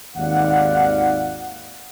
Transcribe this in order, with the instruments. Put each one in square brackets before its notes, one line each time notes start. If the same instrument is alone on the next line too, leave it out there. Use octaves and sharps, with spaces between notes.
[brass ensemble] G#1 D#2 D5 F5 F#5